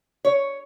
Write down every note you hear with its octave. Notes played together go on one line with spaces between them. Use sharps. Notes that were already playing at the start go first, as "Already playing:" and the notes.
C#5